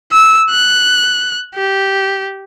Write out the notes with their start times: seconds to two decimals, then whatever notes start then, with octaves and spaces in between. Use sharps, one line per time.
0.13 E6
0.50 F#6
1.55 G4